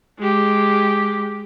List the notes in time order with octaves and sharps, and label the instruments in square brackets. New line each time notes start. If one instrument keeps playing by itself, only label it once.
[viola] G#3 G4